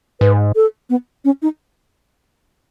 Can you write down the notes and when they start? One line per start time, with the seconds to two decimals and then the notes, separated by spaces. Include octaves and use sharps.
0.20 G#2 B4
0.56 A4
0.90 B3
1.25 C#4
1.42 D#4